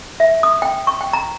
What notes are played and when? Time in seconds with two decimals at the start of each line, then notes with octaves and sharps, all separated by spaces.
0.20 E5
0.43 D#6
0.62 G5
0.87 C#6
1.01 G5
1.13 A#5